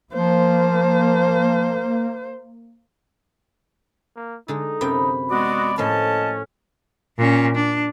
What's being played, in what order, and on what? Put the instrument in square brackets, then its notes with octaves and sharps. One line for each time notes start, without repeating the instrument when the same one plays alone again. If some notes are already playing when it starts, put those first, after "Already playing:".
[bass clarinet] F3 [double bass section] A#3 [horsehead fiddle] C5
[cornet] A#3
[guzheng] D3 G#3 [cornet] D#4
[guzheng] F#2 C3 G5 [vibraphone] B5
[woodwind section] G#3 B3 F#4 [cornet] D5
[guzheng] A2 F3 A#3 [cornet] C#4 [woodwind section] D#5 A5
[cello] A#2 C#4
D4